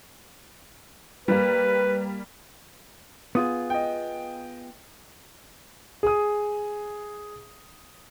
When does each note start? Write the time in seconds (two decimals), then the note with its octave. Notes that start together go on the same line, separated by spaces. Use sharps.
1.28 G3 A#3 B4
3.35 B3 F4 G#4 D#6
3.70 D#5 G5
6.03 G#4 D#6